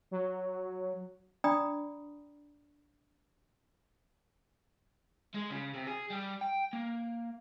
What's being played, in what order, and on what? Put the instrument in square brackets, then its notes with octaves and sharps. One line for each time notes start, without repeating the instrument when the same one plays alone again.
[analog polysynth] F#3
[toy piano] D4 D5 G5 A#5 B5 D#6
[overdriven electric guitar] G#3
C#3
C3
G#4
G3
G5
A#3